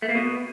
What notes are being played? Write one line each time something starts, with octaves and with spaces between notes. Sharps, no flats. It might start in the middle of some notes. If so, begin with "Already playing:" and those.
A3
A#3
B2